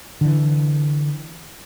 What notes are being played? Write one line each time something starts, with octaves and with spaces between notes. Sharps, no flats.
D3 E3